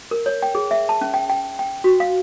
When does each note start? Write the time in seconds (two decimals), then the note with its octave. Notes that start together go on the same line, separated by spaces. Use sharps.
0.11 A#4
0.26 C#5
0.43 G5
0.55 G#4
0.71 E5
0.89 A5
1.01 C#4
1.14 G5
1.29 G5
1.59 G5
1.84 F#4
2.00 F5